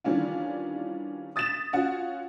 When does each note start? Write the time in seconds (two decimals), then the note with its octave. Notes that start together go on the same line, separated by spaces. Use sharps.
0.04 D#3 E3 G3 C#4 D4 F4
1.36 D#6 A6 B6 E7
1.73 C#4 F4 F#4 F#5